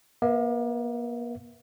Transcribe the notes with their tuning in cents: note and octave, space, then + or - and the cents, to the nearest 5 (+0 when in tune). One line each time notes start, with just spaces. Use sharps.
A#3 +40 B4 +20 E5 +0